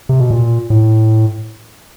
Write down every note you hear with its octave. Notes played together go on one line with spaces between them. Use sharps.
C3
B2
A#2
A2